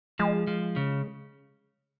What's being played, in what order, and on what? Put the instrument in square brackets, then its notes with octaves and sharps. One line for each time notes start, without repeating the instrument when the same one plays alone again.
[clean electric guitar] F3 [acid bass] G#3
[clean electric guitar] F3
C#3